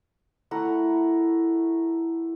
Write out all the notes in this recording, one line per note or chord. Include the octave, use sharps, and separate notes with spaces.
A3 E4 A#4 F#5